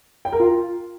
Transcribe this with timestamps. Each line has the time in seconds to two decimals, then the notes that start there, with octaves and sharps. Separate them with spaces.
0.25 G5
0.32 A#4
0.40 F4